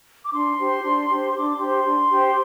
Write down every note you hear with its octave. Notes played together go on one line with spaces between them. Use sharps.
D6
D4 C6
G4 C5
D4
G4 C5
D4 D6
C6
G4 C5
C6
D4
G4 C5